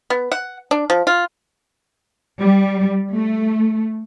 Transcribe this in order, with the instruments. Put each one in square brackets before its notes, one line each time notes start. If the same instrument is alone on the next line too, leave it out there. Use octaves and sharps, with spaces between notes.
[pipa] B3
F#5
D4
F3
F4
[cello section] G3
A3